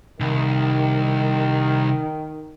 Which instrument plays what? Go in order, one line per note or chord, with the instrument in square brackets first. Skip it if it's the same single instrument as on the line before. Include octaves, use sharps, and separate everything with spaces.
[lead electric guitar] C2 [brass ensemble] D#3